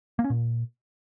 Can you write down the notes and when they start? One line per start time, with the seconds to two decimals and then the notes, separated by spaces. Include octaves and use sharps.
0.19 A#3
0.24 C#4
0.30 A#2